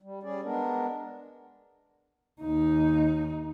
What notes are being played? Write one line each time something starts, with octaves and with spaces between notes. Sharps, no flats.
G3
G3 C#4 G#4 D5
G#3 B3 D4 A#4
D#2 D#4